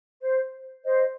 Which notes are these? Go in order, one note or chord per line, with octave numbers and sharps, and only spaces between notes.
C5
C5 D#5